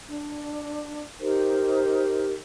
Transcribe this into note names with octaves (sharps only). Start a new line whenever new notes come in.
D4
D#4 G4 A#4 C5